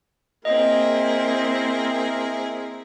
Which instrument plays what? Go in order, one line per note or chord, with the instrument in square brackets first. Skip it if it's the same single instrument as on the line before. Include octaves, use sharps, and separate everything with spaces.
[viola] A#3 C4 [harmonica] E4 G#4 A#4 [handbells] D#5